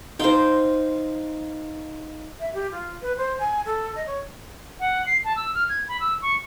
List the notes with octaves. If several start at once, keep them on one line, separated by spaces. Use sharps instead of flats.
D#4 F4 C5 G5
E5
G4
F4
B4
C5
G#5
A4
D#5
C#5
F#5
C7
A5
E6
F6
G#6
B5
E6
C#6